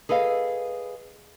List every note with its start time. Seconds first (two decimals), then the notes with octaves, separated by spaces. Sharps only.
0.09 G#4 A4 B4 D#5 F5